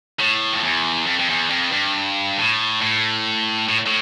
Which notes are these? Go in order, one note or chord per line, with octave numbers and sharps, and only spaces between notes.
A2
F2
E2
F2
F2
E2
F2
G2
A2
A2
A2
A2